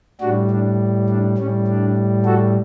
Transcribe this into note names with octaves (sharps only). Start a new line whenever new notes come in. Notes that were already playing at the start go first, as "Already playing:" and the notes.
A2 G3 D4 F#4
D4
D4
A2 G3 C#4
D4
F#4 A4